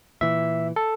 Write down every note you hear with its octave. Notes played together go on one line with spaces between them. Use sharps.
A#2 E3 E5
A4